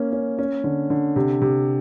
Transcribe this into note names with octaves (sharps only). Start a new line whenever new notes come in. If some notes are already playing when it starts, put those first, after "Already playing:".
Already playing: A#3 C#4
C#4
C#4
D3
D3
C3
C3